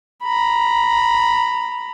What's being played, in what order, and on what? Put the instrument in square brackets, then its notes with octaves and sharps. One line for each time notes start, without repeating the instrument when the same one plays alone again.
[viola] A#5 B5